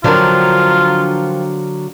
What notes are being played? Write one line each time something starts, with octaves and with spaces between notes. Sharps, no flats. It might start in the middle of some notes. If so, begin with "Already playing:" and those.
D3 F3 F#3 C4 D4 F4 A#4